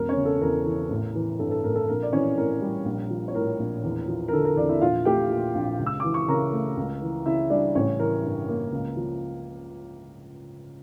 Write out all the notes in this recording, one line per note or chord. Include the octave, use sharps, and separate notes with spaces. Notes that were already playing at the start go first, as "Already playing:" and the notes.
Already playing: E1 A#4
C#4 C#5
C#3
A4
E2 A#4
E3
A1
E3
G2 A4
A4
A1 A#4
A4
A#1 A#4
D5
E3 C#4 C#5
A2 A#4
G3
A#1
F3
C#5
A2 A#4
A#1
E2
F3
A#4
D3 A4
A#4
E2 D4 D5
E4 E5
A#1 F4 F5
A3 G4 G5
A#2
A#1
C#2
E6
E3 D6
C#6
C#3 A#4 A#5
A3
C#2
E3
C#3 E4 E5
G3 D4 D5
A1 C#4 C#5
E3 A#4
G2
A#3
C#2
F3